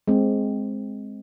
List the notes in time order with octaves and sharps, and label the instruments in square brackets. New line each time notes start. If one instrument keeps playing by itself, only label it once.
[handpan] G#3 C4